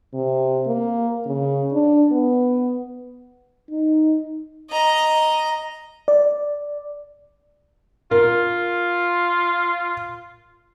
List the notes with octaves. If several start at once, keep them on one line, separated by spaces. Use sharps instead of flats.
C3
A#3
C#3
D4
B3
D#4
D#5 A#5
D5
F4 A#4